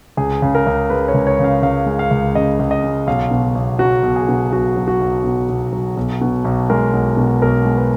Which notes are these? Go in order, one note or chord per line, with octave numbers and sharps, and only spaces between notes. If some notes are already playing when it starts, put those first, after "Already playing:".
C#2 G#4
C#3
A#4
C#2
G#3 B4
C#5
C#2
C#5
C#3
F5
C#2 F5
G#3
F5
C#2
C#3 D#5
C#2
D#5
G#3
B1 F5
B2
B1
F#3 F#4
B1
G#4
B2
B1 F#4
F#3
F#4
B1
B2
B1
F#3
B1
B2
B1
G#3 A#4
B1
B2
B1 A#4
G#3
B4